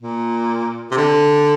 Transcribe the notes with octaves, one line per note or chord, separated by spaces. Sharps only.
A#2
C3
D3